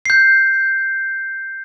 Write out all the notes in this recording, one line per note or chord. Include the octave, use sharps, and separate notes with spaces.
G6 C7